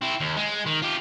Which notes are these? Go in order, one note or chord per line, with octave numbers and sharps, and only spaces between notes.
C4 E4
D#2
G#3
D#3
F4 G4